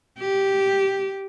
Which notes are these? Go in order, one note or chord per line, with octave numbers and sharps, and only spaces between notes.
G4